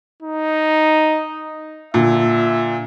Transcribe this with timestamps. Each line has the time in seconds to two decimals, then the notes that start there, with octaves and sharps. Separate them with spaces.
0.22 D#4
1.94 A#2 D3 E5